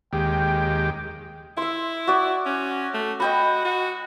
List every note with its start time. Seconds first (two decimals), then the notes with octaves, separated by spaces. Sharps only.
0.13 D#2 G#3 G4 G5
1.57 E4 E5 C6
2.07 F#4 D5
2.46 C#4
2.94 A3
3.20 F#4 D#5 G5 B5
3.65 F#4